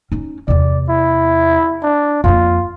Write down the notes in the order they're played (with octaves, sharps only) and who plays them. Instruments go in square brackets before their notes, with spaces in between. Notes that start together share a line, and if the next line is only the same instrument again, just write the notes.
[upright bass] C#4 D#4
[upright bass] E2 C3 [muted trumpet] D5
[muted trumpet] E4
D4
[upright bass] F2 A#3 [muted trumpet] F4